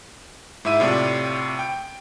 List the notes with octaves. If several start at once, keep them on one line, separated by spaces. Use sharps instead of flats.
G#2 E4 E5 D#7
A2 C3 F4 D5
G5